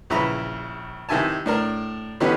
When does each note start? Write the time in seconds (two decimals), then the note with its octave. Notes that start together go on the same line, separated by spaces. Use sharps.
0.10 A#1 C#3 E4 B4 A#5
1.09 C3 D#3 E4 G#5 A5
1.46 A2 D4 A#4
2.20 D3 E3 B3 C#4 D#4 G4